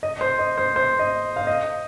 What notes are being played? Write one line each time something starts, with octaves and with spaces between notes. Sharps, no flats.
D#5
C5
D#5
C5
C5
D#5
F5
D#5